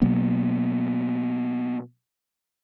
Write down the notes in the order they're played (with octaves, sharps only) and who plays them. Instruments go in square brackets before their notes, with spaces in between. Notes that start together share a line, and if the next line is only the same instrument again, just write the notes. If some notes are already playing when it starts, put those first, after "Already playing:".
[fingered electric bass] B2 F#3 A#3 B3